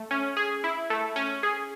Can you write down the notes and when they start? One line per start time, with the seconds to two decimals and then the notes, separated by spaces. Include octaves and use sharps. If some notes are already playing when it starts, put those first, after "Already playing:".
Already playing: A3
0.11 C#4
0.37 G#4
0.64 E4
0.90 A3
1.16 C#4
1.43 G#4